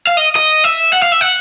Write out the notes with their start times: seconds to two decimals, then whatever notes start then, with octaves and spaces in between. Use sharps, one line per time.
0.07 F5
0.17 D#5
0.36 D#5
0.64 E5
0.93 F#5
1.02 F5
1.12 E5
1.21 F#5